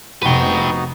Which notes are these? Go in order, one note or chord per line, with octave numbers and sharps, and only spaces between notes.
F1 B3 D#4 F#4 B4 G5